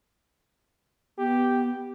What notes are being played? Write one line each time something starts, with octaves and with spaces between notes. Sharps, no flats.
B3 G4